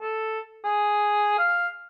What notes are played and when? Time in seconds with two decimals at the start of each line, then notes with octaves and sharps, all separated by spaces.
0.01 A4
0.64 G#4
1.39 F5